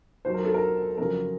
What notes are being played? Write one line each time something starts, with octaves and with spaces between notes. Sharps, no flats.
D#2 D#3 F#3 C5
A#4
A4
A#4
F2 C#3 F#3 A#4